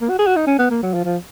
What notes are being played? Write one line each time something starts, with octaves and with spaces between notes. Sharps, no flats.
A#3
F#4
G#4
F#4
D#4
C#4
B3
A#3
F#3
F3
F3